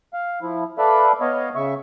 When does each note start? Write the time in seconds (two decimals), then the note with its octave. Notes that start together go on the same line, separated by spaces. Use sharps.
0.13 F5
0.42 F3 E4
0.78 A4 B4 D5 E5 F5 B5
1.21 B3 C#5 D#5 F5
1.55 C#3 E5 C#6